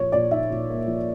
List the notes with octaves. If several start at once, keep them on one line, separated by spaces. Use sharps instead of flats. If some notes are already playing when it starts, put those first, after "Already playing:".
Already playing: A#2 F3 C#5
A#2 D5
D#4 E5
A#2
A#3
F3